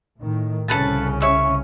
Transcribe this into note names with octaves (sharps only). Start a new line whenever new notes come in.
A2 D#3
C2 C#3 C#4 A4 B4 A5
C#5 E5 C#6